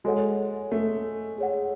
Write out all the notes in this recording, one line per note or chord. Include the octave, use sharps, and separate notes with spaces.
G#3 F#4 A4 C#5 F#5
A3
G#4 C#5 F#5